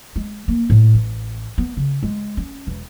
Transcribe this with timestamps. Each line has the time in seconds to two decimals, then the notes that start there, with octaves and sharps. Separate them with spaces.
0.16 G#3
0.48 A#3
0.70 A2
0.94 A1
1.58 B3
1.77 C#3
2.03 G#3
2.37 C#4
2.67 E1